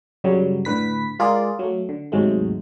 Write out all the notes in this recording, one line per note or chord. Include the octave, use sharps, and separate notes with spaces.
F#2 C#3 F#3 G3
A2 D3 B4 B6
G#3 F4 G#4 A#4 D5
F#3 A3
D3
D#2 G#2 C3 F#3 G#3 A3